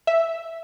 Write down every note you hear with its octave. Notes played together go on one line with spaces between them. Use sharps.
E5